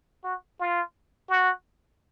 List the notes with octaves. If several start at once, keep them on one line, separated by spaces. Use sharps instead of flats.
F#4
F4
F#4